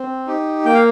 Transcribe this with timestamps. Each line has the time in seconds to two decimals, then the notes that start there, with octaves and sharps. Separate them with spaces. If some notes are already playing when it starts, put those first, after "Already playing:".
Already playing: C4
0.27 D#4 G4
0.65 A#3 G5
0.74 F5